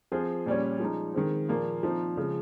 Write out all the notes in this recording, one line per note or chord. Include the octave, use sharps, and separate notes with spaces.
F3 C4 F4 G#4
A#2 G3 C#4
F3 G#3 D#4
D#3 G#3 C4
A#2 F3 A#3 F4 G#4
F3 C4 D#4
C#3 F3 G#3